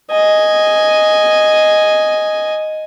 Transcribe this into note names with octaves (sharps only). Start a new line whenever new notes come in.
D#5 G#5